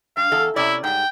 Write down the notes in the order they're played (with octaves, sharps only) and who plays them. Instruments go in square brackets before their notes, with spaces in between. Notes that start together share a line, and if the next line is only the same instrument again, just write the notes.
[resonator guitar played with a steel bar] G2 [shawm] F5
[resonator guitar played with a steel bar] E2 A4
[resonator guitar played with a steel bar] C3 C#4 D5 [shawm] E4
[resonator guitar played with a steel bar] G#2 G3 [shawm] G5